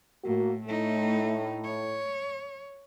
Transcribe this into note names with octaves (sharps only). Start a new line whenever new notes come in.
A2 A#3 F#4
A2 A3 D#4
C#5